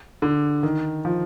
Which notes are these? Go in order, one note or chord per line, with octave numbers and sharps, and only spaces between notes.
D3
D#3
F3